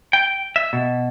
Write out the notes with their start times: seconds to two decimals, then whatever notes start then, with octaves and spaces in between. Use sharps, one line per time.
0.13 G5
0.56 E5
0.73 B2